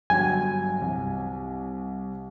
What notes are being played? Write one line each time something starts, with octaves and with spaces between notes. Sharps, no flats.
G1 F#3 G5 G#5
C2